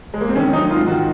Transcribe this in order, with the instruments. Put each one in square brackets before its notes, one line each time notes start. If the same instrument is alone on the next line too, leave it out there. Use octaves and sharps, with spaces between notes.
[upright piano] G#3
A#3
C4
D#3 C#4
F#3 D#4
G#2 F4
D#3 F#4